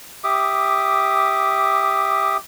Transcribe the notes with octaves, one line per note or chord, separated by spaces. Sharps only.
G4 E5 D6 D#6